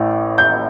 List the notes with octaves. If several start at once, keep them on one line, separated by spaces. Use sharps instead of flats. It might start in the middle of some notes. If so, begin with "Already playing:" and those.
Already playing: A1 A2
G6